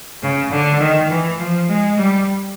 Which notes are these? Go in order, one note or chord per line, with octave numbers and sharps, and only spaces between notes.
C#3
D3
D#3
E3
F3
G#3
G3